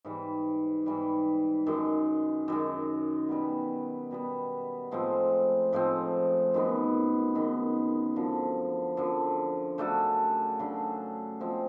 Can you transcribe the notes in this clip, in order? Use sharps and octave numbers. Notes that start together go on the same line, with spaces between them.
G#2 E3 G3
G#2 E3 G3
F#2 D#3 G#3
F#2 D#3 G#3
B2 G3 B3
B2 G3 B3
A2 F3 G#3 C4
A2 F3 G#3 C4
F#2 D#3 G#3 B3
F#2 D#3 G#3 B3
F#2 D3 F3
F#2 D3 F3
C#3 F#3 A3 D4
C#3 F#3 A3 D4
F3 G#3 C4